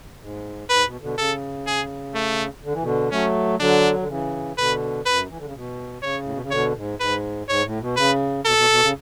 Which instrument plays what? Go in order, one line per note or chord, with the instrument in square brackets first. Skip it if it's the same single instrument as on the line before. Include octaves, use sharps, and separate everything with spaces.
[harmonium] G#2
[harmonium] G#2 [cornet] B4
[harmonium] B2
B2 D3
[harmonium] C#3 [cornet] A4
[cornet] G#4
A3
[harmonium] D3
E3
B2 D3
[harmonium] F#3 A3 [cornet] C#4
[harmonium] D3 F#3 [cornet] D4
[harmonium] D3
C#3 E3
[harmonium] B2 D3 [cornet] B4
[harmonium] F#2 [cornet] B4
[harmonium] E3
D3
C#3
B2
[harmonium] C#3 [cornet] C#5
[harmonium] A2
B2
C#3
[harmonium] B2 D3 [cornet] C#5
[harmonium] G#2
[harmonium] G#2 [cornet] B4
[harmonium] G#2 [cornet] C#5
[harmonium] A2
B2
[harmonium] C#3 [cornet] B4
[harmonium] B2 [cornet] A4
[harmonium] B2
B2
C#3